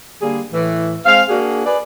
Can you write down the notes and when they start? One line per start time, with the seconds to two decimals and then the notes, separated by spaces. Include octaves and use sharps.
0.22 D3 G3 A#3 G#4
0.53 A2 E3
1.06 G#3 C4 F5
1.29 A#3 D4 F#4 G#4
1.66 G#4 B4 D5